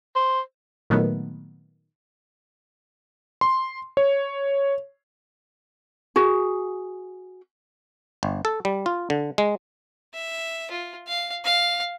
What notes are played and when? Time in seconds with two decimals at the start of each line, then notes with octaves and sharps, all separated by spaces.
0.16 C5
0.90 A#2 D#3 F#3 A3 B3
3.41 C6
3.97 C#5
6.16 F#4 G#4
8.23 G1
8.45 A4
8.65 G3
8.86 F4
9.10 D3
9.38 G#3
10.14 E5
10.71 F4
11.07 F5
11.44 F5